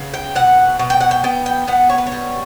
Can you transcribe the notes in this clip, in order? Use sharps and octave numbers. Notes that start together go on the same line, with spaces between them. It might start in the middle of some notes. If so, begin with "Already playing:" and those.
Already playing: C#3 B3
G5
B2 F#5
B2
G5
F#5
G5
B3 G5
G5
B3 F#5
C#5
B4
C#5
G3